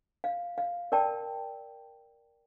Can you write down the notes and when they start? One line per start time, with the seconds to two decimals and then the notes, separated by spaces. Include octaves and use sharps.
0.24 F5
0.58 F5
0.92 A#4 D5 G5 A5